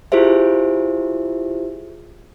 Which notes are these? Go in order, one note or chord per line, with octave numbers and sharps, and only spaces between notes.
E4 F4 G4 G#4 C5 E5